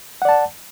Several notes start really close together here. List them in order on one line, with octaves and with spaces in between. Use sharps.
F#5 D5 A5